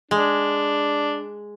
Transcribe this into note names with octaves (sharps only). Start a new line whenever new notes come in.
G#3 D4